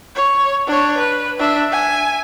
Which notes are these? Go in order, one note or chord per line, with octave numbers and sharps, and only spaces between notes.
C#5
D4 C#5
B4
D4 E5
E5 G#5